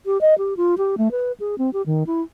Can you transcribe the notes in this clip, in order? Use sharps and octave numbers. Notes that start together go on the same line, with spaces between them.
G4
D#5
G4
F4
G4
A3
B4
G#4
C4
G4
D#3
E4